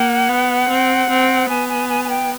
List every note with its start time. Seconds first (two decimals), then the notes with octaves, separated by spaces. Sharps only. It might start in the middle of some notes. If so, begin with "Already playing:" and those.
Already playing: A#3 F#5
0.29 B3
0.68 C4
1.09 C4
1.49 B3 G#5
1.69 G#5
1.89 G#5
2.04 G#5
2.09 G5